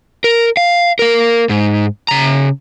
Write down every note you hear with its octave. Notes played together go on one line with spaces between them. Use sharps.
A#4
F5
A#3 A#4
G#2
C#3 A#5